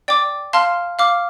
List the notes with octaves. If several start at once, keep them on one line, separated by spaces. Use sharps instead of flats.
D5 G5 D6
F5 A5 C6 F6
F5 D6 F6